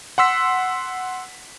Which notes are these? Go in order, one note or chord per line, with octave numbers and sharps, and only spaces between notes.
F#5 C6 E6 B6